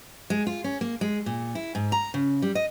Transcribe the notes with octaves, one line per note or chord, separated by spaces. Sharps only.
G#3
F4
C#4
A#3
G#3
A#2
E4
G#2
A#5
C#3
G3
D#5